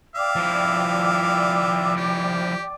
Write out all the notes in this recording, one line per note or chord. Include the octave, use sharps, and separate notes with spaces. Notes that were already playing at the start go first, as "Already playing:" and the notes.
D5 E5 F5 G5 D6
F3 E4
G4